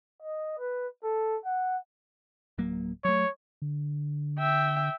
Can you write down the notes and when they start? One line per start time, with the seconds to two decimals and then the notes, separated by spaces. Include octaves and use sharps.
0.22 D#5
0.59 B4
1.03 A4
1.45 F#5
2.58 D1 F#3 A#3
3.05 F#3 A3 C#5
3.62 D3
4.39 E5 G5